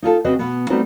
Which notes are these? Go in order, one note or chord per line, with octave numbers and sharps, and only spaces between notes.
D#4 F4 G#4 A4
C#3 C4 F#4 B4 D#5
B2 B3
G3 A3 B3 C4 D#4 F#4